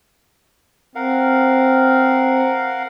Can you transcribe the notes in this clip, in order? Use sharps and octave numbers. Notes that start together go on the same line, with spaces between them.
C4 A#4 F5 F#5